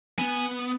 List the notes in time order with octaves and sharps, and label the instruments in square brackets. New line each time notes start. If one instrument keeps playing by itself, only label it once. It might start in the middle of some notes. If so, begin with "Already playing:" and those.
[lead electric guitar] B3 [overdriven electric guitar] G#5